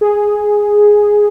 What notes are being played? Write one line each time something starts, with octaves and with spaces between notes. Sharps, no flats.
G#4